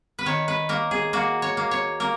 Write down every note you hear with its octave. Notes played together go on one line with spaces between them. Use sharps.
B4
D#3 C#5
B4
A#3 A#4
G#4
A#3 F#4
C#5
A#3
C#5
A#3 A#4